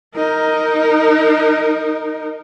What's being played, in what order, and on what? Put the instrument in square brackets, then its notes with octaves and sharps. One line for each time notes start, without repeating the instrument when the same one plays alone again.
[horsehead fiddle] D#4 A#4